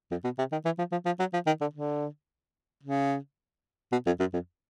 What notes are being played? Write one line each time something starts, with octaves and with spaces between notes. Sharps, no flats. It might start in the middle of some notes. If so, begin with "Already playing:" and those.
F2
B2
C3
D#3
E3
F3
F3
F3
F#3
F3
D#3
D3
D3
C#3
B2
F2
F#2
F2